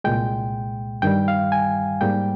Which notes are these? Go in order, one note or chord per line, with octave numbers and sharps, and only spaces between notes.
C2 A#2 G#3 G5
G2 D#3 G3 G5
F5
G#5
G#2 G3 A#3 G5